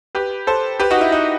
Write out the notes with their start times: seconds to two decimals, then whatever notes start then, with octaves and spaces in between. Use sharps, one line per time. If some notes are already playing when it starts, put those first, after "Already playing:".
0.15 G4 B4
0.47 A4 C5
0.80 G4 B4
0.90 D#4 F#4
1.01 E4
1.12 D#4